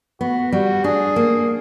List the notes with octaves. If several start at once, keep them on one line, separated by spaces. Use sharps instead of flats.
B3 F#4
G3 F#4
D4 G#4
A#3